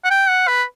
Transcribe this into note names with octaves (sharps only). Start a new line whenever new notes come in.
F#5
G5
F#5
B4